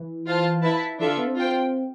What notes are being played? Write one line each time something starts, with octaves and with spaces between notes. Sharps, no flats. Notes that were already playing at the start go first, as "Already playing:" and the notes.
Already playing: E3
F4 C5 F5 A5
E4 B4 E5 A5
E3 D4 F4 A4 E5
D3
B3
C4
F4 C5 G5